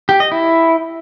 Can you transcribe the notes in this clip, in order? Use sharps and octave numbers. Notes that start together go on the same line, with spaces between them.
G4
D#5
E4